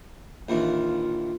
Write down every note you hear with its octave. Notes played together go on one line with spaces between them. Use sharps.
A#1 D#2 E3 F4